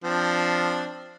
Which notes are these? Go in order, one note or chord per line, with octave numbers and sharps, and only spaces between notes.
F3 C4 D4